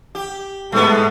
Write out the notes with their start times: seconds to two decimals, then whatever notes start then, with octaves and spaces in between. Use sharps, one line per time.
0.15 G4
0.72 A2 G#3 A3 B3